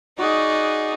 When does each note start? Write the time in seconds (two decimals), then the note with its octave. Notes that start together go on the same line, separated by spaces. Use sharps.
0.18 D#4 F#4 G#4 D5